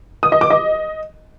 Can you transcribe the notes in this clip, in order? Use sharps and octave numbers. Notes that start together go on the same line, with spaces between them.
D#6
D#5
D6
D#5